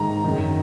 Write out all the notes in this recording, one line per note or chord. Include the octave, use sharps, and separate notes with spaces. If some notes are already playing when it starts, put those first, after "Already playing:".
Already playing: G#2 D#3 A#5
F#2 D#3